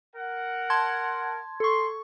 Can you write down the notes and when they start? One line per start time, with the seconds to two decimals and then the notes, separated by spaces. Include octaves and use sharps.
0.16 A#4 F#5
0.70 A5 C6 G#6
1.60 A4 C6 C#6